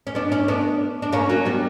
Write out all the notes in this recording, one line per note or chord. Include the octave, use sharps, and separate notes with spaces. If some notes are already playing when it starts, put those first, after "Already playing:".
C#4
B3 D4
C#4 E4
B3 D4
D4
A#3 C#4
F#3 A#3
G3 B3